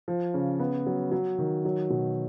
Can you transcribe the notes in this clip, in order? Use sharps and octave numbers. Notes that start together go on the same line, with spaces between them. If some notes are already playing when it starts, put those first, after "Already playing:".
F3
C#3
B3
F#3
F#3
D#3
F#3
B2